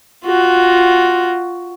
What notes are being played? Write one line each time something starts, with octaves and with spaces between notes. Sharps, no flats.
F4 F#4